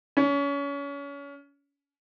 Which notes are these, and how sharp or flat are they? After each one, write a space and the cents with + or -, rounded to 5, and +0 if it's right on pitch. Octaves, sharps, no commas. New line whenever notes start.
C#4 +30